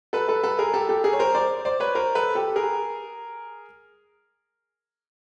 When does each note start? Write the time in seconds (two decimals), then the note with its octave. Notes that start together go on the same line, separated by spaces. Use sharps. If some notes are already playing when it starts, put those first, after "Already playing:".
0.13 A4 B4
0.28 A4 B4
0.44 A4 B4
0.59 G#4 A#4
0.74 G4 A4
0.89 G4 A4
1.04 G#4 A#4
1.13 C#5
1.19 A#4 C5
1.35 C5 D5
1.65 C5 D5
1.80 B4 C#5
1.95 A#4 C5
2.15 A4 B4
2.35 G4 A4
2.56 G#4 A#4